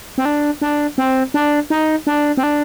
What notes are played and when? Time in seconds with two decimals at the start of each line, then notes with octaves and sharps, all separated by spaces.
0.18 C4
0.25 D4
0.62 D4
0.98 C4
1.34 D4
1.70 D#4
2.07 D4
2.37 C4
2.43 D4